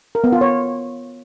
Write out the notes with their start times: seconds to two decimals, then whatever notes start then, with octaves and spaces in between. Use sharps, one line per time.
0.15 A#4
0.24 B3
0.32 F4
0.41 C#5